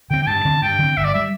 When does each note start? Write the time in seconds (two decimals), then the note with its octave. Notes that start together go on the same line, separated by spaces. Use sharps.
0.10 D3 C4 G5
0.22 G5
0.27 G2 A5
0.45 D3 C4
0.62 G2 G5
0.79 D3 C4
0.97 G1 E5
1.05 D5
1.14 G3 E5